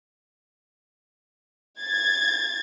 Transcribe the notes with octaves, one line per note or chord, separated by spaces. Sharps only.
G#6 A6